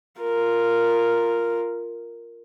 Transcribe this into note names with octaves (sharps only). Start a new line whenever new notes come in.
F4 A#4